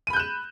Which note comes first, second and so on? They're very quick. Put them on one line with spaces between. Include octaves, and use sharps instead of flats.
D#7 B5 G6 F#6 E7